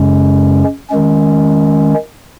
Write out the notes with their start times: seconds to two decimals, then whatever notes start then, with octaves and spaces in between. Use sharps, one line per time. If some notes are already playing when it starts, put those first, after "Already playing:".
Already playing: F#2 C#3 G#3 C#4
0.90 D#3 G#3 C#4